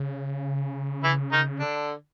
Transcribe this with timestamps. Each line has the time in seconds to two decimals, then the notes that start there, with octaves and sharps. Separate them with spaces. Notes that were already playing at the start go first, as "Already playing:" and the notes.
Already playing: C#3
1.04 E3 E4
1.32 D#3 D#4
1.59 D3 D4